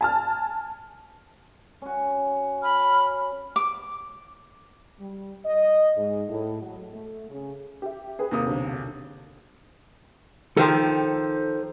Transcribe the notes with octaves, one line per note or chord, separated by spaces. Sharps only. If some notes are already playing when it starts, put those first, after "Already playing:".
G#5 A5 F6
C#4 F#4
B5 F6
D6
G3
D#5
G#2
A2
F#3
A3
C#3
G4 E5
G#4 B4 G5
D#2 C3 A#3 D#6
B1 D3 C5
D#3 F3 A4 C5 G5